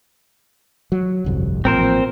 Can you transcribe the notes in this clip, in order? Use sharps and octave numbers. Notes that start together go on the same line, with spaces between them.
F#3
G1 C2 F2
A1 A#2 F3 C4 A#4 C5